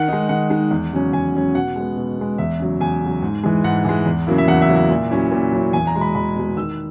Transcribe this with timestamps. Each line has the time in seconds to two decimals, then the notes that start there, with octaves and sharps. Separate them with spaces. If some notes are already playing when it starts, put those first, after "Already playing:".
Already playing: D#3 F#5
0.08 G#3 D#4
0.29 D#3 F#5
0.50 G#3 D#4
0.71 E2
0.93 C#3 F#3 C#4
1.13 E2 G#5
1.34 C#3 F#3 C#4
1.55 B2 F#5
1.76 G#3 B3
1.97 B2
2.18 G#3 B3
2.38 E2 E5
2.60 C#3 F#3
2.81 E2 G#5
3.02 C#3 F#3
3.22 G#2
3.43 E3 G#3
3.64 G#2 F#5
3.85 E3 G#3
4.06 E2
4.27 C#3 F#3 A#3 E4
4.38 E5
4.48 E2 F#5
4.62 E5
4.68 C#3 F#3 A#3 E4
4.76 E5
4.90 A#2
5.10 F#3 C#4 E4
5.32 A#2
5.53 F#3 C#4 E4
5.73 E2 G#5
5.87 A#5
5.95 B2 G#3
6.01 B5
6.15 E2 B5
6.36 B2 G#3
6.56 D#3 E6